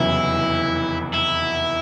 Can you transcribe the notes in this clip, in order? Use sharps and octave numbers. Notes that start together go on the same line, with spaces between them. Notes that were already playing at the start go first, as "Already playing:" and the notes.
Already playing: F1 E2 C#3 F#3 E4
E4